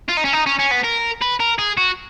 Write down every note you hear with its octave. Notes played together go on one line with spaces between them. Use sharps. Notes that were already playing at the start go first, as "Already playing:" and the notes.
F4
D#4
C#4
D#4
C#4
C#4
B3
A#4
B4
A#4
G#4
F#4